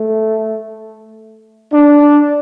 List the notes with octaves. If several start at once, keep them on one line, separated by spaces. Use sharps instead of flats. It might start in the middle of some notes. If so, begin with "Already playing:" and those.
Already playing: A3
D4